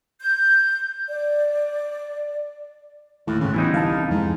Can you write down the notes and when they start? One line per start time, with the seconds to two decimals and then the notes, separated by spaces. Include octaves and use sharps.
0.20 G6
1.08 D5
3.27 D#2 A2
3.40 E2 G#2 C#3
3.54 G1 E3 D#4
3.74 C2 F5 A5
4.10 F2 G#2